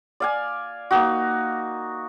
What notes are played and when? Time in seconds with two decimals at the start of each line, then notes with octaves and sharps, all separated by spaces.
0.20 D5 F5 G#5
0.91 A#3 D#4 F#4